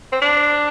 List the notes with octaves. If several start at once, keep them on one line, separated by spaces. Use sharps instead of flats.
C4
D4